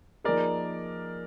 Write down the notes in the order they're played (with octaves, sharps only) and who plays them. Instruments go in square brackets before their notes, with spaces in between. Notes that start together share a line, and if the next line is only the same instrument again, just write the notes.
[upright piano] F3 A#3 D#4 G#4 [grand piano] A#4 D5